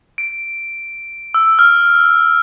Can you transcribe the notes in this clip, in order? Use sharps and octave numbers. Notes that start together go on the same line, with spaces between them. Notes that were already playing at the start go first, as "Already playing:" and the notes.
D7
E6
F6